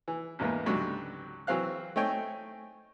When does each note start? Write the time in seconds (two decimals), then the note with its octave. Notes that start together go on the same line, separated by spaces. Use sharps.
0.08 E3
0.39 A1 E2 G#2 A#3 B3
0.66 C#2 G#2 D3 F#3 G3
1.47 E3 F#3 C4 F5 F#6
1.96 A3 C4 D#4 C#5 G5 G#5